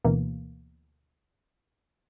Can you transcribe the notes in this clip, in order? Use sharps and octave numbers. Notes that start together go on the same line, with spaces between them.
D2 B2 E3 A#3